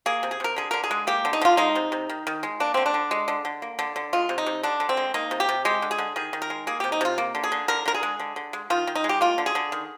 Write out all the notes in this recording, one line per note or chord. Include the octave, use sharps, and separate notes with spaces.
A#3 G#4
C3
G#4
C3 A#4
D3 G#4
D3 A#4
G#4
G#3
A#3 G4
D3
D#4
D3 F4
G#3 D#4
C3
C3
D#3
D#3
G#3
A#3 D4
D3 C4
D4
D3
G#3
D3
D3
A#3
D3
D3
G#3 F4
C3
D#4
C3
D3 D4
D3
C4
G#3
A#3 D#4
C3
G4
C3
G#3 G4
D3
G#4
D3
D#3 G#4
D#3
A#4
G#3
A#3 G#4
C3 G4
D#4
C3 F4
A#3
D3
G#4
D3
D3 A#4
D3 A#4
G#4
G#3
D3
D3
G#3
D#3 F4
D#3
D#4
G#3
G4
A#3 F4
D3
G#4
D3
D#3